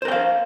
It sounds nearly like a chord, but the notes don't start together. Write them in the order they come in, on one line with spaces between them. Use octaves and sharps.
C5 A#4 G5 F5